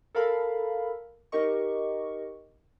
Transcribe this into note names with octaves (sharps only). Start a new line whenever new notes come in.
A4 A#4 F5 B5
D#4 G4 A#4 D#5 C#6